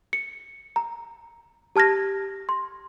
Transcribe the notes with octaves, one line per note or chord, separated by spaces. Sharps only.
C#7
A#5
G4 A5 F6 G#6 A#6
C6